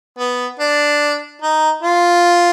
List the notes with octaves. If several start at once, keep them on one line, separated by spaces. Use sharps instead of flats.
B3
D4
D#4
F4